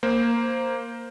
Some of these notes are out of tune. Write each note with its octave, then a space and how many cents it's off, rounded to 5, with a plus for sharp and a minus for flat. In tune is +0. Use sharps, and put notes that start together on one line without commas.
A#3 +0 C5 +0